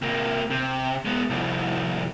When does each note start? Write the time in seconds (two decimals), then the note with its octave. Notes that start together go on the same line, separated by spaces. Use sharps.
0.02 C3 A#3
0.50 C3
1.05 G#3 B3
1.30 C2 F2